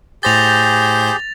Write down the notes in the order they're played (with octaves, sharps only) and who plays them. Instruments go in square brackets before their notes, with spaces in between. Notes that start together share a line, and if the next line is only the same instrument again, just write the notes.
[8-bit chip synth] A2 C5 G6 [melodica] G4 G#4 [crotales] A6 A#6 F7